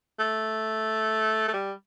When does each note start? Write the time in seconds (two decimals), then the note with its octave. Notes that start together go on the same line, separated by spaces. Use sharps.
0.19 A3
1.48 A3
1.53 G3